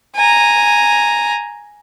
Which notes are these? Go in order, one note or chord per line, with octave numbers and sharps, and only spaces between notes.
G#5 A#5